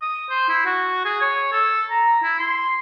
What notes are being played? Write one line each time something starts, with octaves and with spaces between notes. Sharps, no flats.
D#6
C5
E4
F#4
G#4
C#5
A4
A#5
E4
C6